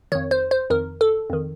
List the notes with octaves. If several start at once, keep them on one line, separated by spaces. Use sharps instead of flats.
F2 D#3 C#5
C5
C5
F2 D#3 A#4
A4
F2 D#3